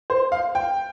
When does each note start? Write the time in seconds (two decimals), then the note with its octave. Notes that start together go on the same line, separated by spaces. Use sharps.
0.10 C5
0.32 F5
0.55 G5